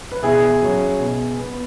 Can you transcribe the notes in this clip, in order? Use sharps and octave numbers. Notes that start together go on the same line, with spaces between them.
B4
B2 E4 G#4
F#3 C#4
B2
B3